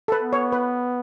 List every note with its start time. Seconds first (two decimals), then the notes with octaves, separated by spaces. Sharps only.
0.08 A4
0.12 B4
0.22 B3
0.33 C#5
0.52 B4